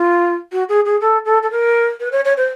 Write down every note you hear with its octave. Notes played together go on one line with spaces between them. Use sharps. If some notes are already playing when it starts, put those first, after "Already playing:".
Already playing: F4
F#4
G#4
G#4
A4
A4
A4
A#4
B4
C#5
C#5
C5